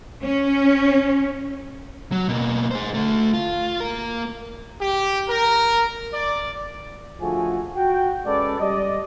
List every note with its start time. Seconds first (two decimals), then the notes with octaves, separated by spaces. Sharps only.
0.23 C#4
2.12 F#3
2.29 B2 A#3
2.71 G#4 C5
2.94 D3 A3
3.34 F4
3.80 A#3 A#4
4.81 G4
5.29 A#4
6.14 D5
7.20 D3 F3 A3 F#4 G#4 G#5
7.75 F#4 G5
8.26 G#3 C#4 A4 B4 D5
8.59 G3 D5 D#5